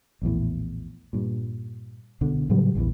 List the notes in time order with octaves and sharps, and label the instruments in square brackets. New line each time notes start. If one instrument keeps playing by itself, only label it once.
[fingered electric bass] A#1 E2 A2
G2 A#2
C2 B2 D3
A2 C#3 F#3 G3
A#1 E2 D3 E3